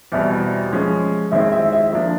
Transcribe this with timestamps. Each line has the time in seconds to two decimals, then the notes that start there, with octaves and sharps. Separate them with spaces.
0.12 E2 B2 G3 C4 E5
0.72 F3 G#3 C#4
1.31 D#3 G#3 C4 E4 E5
1.52 E5
1.72 E5
1.92 F3 A#3 D4